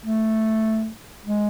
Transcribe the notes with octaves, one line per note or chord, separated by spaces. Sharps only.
A3
G#3